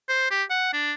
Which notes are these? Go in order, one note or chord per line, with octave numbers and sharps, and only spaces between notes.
C5
G4
F#5
D4